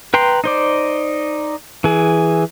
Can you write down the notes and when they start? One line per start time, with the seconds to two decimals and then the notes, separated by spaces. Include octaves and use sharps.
0.14 B4 G5 A#5 C6
0.44 D#4 C5 D5
1.84 E3 G#4